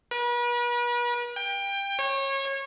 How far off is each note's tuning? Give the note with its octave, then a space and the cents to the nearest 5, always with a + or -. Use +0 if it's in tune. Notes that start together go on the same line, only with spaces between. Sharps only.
B4 -40
G5 +20
C#5 -25